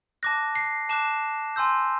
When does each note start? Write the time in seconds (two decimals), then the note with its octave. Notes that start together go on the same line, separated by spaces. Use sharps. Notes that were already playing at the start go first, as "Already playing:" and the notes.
0.23 A5 D6 F#6 A#6
0.55 C7
0.89 A5 D6 F#6 E7
1.56 G#5 C6 E6 G6